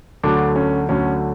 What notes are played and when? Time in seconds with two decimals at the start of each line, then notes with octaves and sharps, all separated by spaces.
0.23 D2 D3 F#3 D4
0.55 C#4
0.89 D2 D3 F#3 C#4